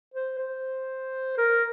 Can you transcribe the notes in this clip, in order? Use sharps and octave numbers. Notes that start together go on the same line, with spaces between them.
C5
C5
A#4